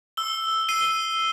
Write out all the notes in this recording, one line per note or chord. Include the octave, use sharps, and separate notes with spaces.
E6 G7
C7 D#7 G7